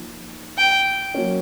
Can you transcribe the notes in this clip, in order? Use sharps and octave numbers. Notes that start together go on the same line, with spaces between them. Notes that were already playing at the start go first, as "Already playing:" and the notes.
Already playing: F3 A#3 D#4
G5
F#3 A#3 C#4